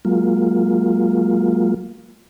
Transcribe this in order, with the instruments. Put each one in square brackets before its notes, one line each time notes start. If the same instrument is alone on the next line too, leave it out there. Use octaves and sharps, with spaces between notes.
[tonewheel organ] F#3 G#3 A#3 F4